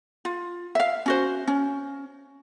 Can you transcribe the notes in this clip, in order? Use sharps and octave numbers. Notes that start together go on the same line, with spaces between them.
F4
E5 F5
C#4 F#4 C5
C#4